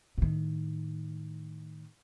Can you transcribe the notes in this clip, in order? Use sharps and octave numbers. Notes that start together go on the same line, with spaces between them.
A2 D#3